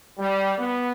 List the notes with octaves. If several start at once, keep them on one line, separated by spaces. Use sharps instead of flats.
G3
B3